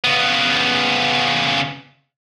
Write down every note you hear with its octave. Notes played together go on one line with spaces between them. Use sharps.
C#3 B3